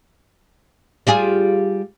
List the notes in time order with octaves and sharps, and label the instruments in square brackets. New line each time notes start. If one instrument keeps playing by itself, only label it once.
[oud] G3 F4 G#4